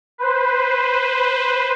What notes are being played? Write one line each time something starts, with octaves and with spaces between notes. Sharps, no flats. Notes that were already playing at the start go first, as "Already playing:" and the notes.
B4 C5